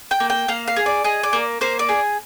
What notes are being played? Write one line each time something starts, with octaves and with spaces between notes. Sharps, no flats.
G5
A#3
G5
A#3 F5
F5
G#4
D5
G#4 D#5
D5
A#3
A#3 C5
D5
G#4